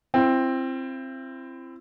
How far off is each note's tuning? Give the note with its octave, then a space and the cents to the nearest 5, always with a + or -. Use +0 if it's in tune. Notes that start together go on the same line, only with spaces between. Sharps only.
C4 +10 E4 +40